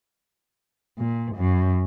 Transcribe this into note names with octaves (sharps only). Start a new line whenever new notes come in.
A#2
F#2